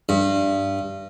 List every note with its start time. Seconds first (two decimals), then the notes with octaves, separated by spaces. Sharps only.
0.09 G2